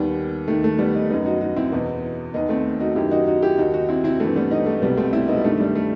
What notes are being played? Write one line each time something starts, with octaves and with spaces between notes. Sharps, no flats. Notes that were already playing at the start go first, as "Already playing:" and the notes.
Already playing: D#2 D#3 G3 B3
D#2 D#3 A3
A3
G3 B3
B3 D#4
F#2 D#3 B3 D#4
D#4 F#4
D#4 F#4
C4 E4
E2 B2 B3 D#4
D#2 D#3 B3 D#4
A3 C4
D#4 F#4
F#2 D#3 E4 G4
D#4 F#4
D#4 F#4
E4 G4
D#2 D#3 D#4 F#4
D#4 F#4
C4 E4
C4 E4
G2 E3 A3 C4
G3 B3
B3 D#4
A3
C2 B2 G3 B3
A3 C4
C4 E4
B3 D#4
G3
G2 D#3 A3
G3
A3